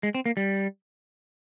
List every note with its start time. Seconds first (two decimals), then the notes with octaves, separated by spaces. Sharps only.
0.03 G#3
0.15 C4
0.26 A#3
0.37 G3